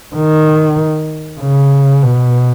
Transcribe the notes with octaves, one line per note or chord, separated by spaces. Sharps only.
D#3
C#3
B2